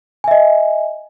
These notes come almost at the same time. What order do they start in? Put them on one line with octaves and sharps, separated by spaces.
G#5 E5 D#5